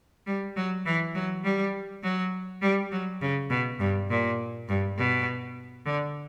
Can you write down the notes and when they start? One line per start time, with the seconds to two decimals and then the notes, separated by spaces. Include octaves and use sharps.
0.27 G3
0.56 F#3
0.86 E3
1.15 F#3
1.44 G3
2.03 F#3
2.62 G3
2.92 F#3
3.21 C#3
3.50 B2
3.80 G2
4.10 A#2
4.69 G2
4.98 B2
5.86 D3